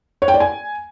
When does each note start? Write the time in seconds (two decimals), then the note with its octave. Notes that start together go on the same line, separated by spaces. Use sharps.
0.22 C#5
0.28 G5
0.34 D5
0.40 G#5